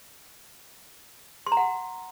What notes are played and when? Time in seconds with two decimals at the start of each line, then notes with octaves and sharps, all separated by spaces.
1.47 C6
1.52 A#5
1.57 F#5